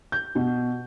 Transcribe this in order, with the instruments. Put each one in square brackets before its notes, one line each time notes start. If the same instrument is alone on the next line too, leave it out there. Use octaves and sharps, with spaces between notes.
[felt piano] G6
B2